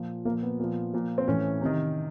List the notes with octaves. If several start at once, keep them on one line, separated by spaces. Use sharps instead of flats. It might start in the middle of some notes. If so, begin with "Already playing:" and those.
Already playing: A#2 F3
A#2 F3 A#3
B3
A#2 F3
A#2 F3
C4
A2 E3 C#4
C3 D#3